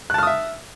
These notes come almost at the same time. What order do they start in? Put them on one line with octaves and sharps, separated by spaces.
F#6 A5 F6 D#6 E5